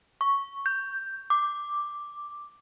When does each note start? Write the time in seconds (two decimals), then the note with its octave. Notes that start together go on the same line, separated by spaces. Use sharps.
0.21 C#6
0.66 G6
1.30 D6